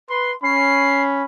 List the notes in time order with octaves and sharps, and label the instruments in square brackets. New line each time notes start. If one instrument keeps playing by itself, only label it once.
[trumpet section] B4 C6
[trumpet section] C#4 B5 [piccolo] C7